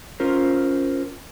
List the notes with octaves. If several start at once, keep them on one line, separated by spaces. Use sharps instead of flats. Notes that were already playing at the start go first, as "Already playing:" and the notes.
C#4 F4 A#4 C5